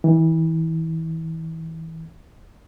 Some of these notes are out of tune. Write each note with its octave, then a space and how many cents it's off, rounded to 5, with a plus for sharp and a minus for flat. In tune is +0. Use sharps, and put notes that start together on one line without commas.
E3 -30